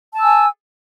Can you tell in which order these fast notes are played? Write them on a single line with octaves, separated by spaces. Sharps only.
A5 E6 G#5